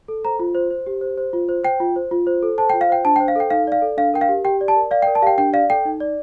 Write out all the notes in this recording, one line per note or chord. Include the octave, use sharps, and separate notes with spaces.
A4
C5 A#5
F4
C5
C5
G4
C5
C5
F4
C5
C5 G5
F4
C5
F4
C5
A4
C5 A5
G5
F4
F5
C5 G5
D4 A5
G5
C5
F5
A4 G5
D#4 F5
D5 F5
A4
D4 F5
A#4 G5
F5
G4
G4 G5
D5
A5
A#4
D5 F5
G5
A#4
A5
G4 F5 G5
D4 G5
D5 F5
A4 G5
D#4
D5